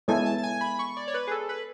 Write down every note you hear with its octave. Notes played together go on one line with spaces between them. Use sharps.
G#3 B3 E4 A4 C#5 G#5
A5
A5
G#5
B5
C#6
D5
C#5
B4
G#4
A4
B4